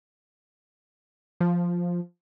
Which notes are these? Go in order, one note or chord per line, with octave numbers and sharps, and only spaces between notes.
F3